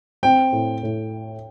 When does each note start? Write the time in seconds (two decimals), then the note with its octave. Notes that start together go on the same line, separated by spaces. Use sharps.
0.23 C4 G5
0.53 A2
0.83 A2